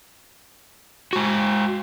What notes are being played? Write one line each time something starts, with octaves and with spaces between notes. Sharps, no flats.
G#3 F#4